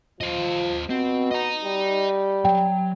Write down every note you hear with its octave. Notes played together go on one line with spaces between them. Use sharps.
F3 F4 D#5
B2 C4
D#5 A#5
G3
F#3 G5